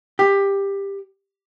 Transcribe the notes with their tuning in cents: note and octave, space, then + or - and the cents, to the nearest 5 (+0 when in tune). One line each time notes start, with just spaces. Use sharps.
G4 +15